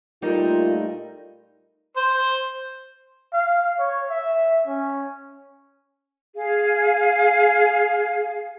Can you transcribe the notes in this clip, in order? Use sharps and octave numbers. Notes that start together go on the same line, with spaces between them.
A#2 G3 A3 D#4 F4 A#4
C5
F5
C#5
E5
C#4
G#4 F5